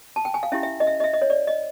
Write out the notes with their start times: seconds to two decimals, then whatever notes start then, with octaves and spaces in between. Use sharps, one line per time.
0.16 A5
0.25 G5
0.34 G#5
0.43 F5
0.52 C#4 E4 G4 E5
0.63 E5
0.80 D#5
0.87 E5
1.00 D#5
1.04 E5
1.14 D#5
1.22 C#5
1.30 D5
1.47 D#5